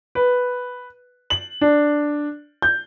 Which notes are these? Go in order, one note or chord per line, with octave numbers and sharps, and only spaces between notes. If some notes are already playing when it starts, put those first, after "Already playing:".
B4
F#7
D4
G6